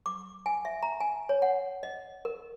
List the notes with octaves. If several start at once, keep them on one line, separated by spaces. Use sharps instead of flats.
D6
G#5
E5
A#5
G#5
C#5
F#5
D#5
A#4